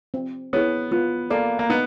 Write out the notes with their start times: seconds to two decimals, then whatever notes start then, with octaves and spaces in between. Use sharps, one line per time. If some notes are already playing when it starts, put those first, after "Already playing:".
0.14 C4
0.53 B3 E4 G#4 C#5
0.92 B3 F4
1.30 A#3 A4 D5 F5
1.59 A#3
1.70 B3 D#4